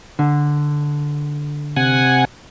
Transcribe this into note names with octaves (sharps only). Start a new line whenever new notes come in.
D3
C3 F#5 G#5